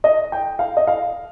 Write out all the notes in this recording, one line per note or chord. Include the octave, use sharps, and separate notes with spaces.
D#5
G5
F5
D#5
F5